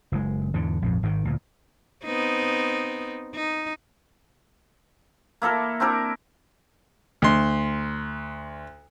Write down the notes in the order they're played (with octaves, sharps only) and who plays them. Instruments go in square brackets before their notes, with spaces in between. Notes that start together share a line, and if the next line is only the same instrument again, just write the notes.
[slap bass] F#1 C3 G#3
E2 G#2 D3
A#1 F2 G#2
G#1 G#2 B2 D#3
D2 A#2
[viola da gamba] B3 C4 D#4
D#4
[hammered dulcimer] A#3 E4 A4 A#4
C4 D4 E4 A#4
[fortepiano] D2 C6